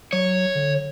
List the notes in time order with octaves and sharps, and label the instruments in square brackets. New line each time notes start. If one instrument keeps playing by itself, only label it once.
[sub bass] F#3 [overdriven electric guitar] C#5
[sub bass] D3